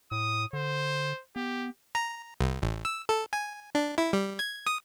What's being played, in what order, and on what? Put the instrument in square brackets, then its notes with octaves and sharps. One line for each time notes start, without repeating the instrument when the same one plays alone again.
[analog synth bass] A2 [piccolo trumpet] D#6
[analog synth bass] D3 [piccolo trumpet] C5
[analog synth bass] B3 [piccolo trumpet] G4
[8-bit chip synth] A#5
C2
A1
E6
A4
G#5
D4
E4
G3
G#6
D#6